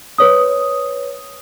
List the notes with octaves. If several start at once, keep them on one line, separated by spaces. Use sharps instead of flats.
B4 C#5 D#6